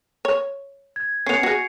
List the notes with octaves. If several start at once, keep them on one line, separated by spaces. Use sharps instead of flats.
C#5
G#6
B3 C#4 C7 C#7 F7
F#4 G#4